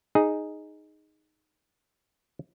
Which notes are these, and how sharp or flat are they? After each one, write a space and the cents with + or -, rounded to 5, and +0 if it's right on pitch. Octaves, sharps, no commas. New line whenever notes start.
D#4 -5 G#4 +0